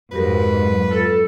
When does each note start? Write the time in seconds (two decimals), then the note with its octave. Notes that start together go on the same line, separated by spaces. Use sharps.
0.12 F2 G#2 F#4 G4 A#4 B4
0.58 F#3
0.91 F4 A4